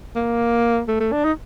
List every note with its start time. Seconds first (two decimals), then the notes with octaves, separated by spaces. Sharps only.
0.16 A#3
0.88 A3
1.00 A3
1.12 D4
1.25 D#4